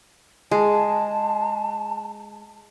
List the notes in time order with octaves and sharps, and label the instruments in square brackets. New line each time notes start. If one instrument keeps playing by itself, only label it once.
[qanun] G#3 [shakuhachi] A5